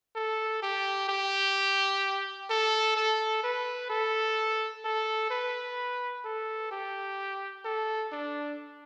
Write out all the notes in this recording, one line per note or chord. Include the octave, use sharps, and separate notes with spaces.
A4
G4
G4
A4
A4
B4
A4
A4
B4
A4
G4
A4
D4